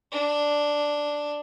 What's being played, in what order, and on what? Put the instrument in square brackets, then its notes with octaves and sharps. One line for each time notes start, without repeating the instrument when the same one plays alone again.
[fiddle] D4